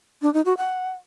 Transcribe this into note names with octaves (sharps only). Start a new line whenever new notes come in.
D4
D#4
F#4
F#5